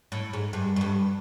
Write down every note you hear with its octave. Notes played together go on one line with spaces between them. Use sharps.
A2
G#2
G2
F#2
G2